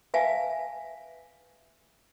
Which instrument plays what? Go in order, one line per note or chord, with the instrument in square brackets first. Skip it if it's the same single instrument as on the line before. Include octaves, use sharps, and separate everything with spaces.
[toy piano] B4 E5 F5 G#5 A5